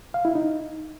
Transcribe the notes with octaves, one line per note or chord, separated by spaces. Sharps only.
F5
E4
D#4